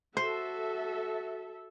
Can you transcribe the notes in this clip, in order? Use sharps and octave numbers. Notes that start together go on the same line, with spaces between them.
F#4 A4 C5 E5